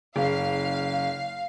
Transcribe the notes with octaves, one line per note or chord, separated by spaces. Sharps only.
F#1 F5